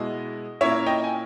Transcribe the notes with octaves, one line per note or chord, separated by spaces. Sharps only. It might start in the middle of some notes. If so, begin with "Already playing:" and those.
Already playing: B2 G#3 B3 E4 D#5
A#2 A#3 C#4 E4 C#5 E5
D#5 G5
G#5